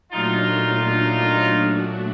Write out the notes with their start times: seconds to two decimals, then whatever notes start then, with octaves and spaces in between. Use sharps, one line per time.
0.12 A#2 F#3 A3 D4 D#4 F4 F#4